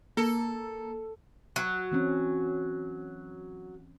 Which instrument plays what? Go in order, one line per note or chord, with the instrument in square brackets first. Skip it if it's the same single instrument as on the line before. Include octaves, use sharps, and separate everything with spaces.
[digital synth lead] A#3 [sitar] A4
[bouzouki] F#3
[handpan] E3 C4 C#4